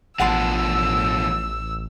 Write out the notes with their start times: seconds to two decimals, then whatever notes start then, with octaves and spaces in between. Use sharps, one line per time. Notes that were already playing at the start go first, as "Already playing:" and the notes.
0.20 A1 B2 F3 F#5 A5 C6 E6